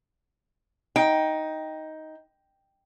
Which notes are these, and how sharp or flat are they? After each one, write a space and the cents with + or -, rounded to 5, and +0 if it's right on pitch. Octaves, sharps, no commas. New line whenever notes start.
D#4 +10 G5 +0